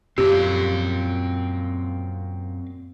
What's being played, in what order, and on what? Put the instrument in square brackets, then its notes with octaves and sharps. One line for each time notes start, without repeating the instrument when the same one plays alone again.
[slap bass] F#2 A#2 [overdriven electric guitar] C4 F5 [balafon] G4